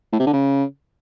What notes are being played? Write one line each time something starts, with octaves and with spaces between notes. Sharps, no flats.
A2
C3
D3
C#3